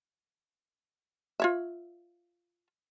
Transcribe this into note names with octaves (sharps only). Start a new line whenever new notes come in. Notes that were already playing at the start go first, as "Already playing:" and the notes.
F4 C#5 E5